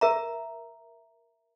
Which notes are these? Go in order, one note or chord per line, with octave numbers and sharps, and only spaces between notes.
A#4 E5 A#5